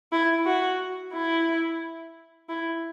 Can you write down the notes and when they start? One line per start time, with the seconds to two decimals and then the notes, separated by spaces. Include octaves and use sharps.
0.12 E4
0.45 F#4
1.13 E4
2.49 E4